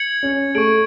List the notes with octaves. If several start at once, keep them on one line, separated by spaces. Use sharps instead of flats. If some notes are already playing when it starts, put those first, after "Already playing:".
Already playing: G#6 C#7 F#7
C#4
A3 C#6 G#6 D7 F#7